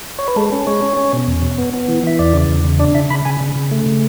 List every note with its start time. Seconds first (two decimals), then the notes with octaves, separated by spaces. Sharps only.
0.19 C#5
0.28 B4
0.36 G#3 A4
0.52 C#4
0.67 G#3 C#5
0.82 C#4
0.97 C#4
1.13 B2
1.27 E2
1.42 B2
1.58 B3
1.74 B3
1.88 E3
2.03 E3 E5
2.19 E2 D5
2.34 C#3
2.49 E2
2.65 C#3
2.79 D4 D5
2.95 C#3 E5
3.10 C#3 B5
3.25 C#3 G#5
3.41 C#3
3.56 C#3
3.71 A3
3.86 C#3